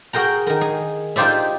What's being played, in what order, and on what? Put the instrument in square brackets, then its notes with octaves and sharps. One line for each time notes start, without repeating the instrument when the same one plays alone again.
[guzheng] F#4 G#4 A#4 G5 A#5
D#3 A#4
G#4
D#4 F4 G4 C5 D5 E5